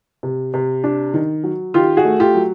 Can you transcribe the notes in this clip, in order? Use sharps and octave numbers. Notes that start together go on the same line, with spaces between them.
C3
C3
D4
D#3
F#3
D#3 F4 G4
F#4 G#4
A3
F4 G4
F#3